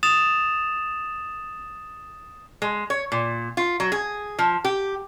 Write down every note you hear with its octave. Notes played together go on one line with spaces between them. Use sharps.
D#6 A6 E7 F7
G#3
C#5
A#2
F4
F#3
G#4
F3
G4